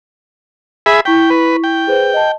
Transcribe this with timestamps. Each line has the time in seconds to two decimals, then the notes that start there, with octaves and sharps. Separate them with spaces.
0.86 G#4 E5 B5
1.05 E4 G5 C#6 B6
1.30 B4
1.64 G5
1.87 G#4 B4 C5
2.14 D#5 A5